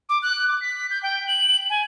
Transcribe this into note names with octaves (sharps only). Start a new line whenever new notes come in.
D6
F#6
D6
B6
G6
G5
F#7
G#5